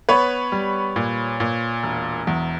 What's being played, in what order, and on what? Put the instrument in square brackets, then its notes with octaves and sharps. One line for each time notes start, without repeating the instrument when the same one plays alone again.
[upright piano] B3 B4 C#5
G3
A#2
A#2
E1
E2